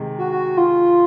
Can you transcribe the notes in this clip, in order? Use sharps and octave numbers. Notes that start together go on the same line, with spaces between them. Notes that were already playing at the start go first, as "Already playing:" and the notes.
Already playing: C3 D#3 G#3
F#4
F#4
F4